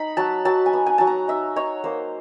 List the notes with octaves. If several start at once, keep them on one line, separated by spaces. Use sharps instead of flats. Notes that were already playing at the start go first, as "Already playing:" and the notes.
Already playing: D#4 B5
F#3 A5
F#3 A5
G#5
B3
G#5
F#3 A5
A#5
D#4 E5
D#4 C#5
A#3 C5